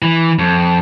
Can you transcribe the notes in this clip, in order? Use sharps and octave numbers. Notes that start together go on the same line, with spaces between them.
E3
F2